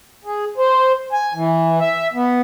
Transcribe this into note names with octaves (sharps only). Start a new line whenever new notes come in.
G#4
C5
G#5
E3
E5
B3